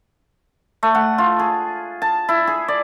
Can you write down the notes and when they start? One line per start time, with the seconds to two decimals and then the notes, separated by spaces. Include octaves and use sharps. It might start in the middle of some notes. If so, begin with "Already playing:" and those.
0.83 A3
0.95 F#5
1.18 F4
1.39 G#4
2.02 A5
2.29 E4
2.47 G#4
2.68 D5